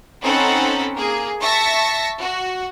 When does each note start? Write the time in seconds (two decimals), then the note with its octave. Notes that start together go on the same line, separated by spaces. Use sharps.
0.22 C4 C#4 D#4 A4 F#5 B5
0.98 A#3 G#4
1.42 E5 A5 C#6 A#6 B6 C#7
2.19 F#4